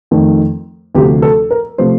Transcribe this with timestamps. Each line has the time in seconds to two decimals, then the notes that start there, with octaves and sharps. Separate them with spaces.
0.11 F2 D#3 A3
0.95 D2 C3 F3 A3 G4
1.22 A4
1.50 A#4
1.78 C3 F3 A3 C5